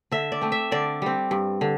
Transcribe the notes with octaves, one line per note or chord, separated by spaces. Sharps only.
D3 E5
D5
A3 C4
E5
D3 D5
G3 C4
G2
D3